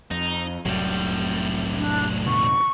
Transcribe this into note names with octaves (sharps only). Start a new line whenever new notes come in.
F2 D#4
F1 C2 A2 F#3 G3
D4
F2 B2 D3 C#6